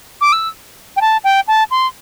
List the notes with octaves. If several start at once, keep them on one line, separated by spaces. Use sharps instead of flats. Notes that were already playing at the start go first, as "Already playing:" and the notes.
D6
E6
G5
A5
G5
A5
C6